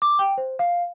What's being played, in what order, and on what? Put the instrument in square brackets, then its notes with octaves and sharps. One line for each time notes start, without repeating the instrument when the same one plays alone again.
[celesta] D6
G5
C5
F5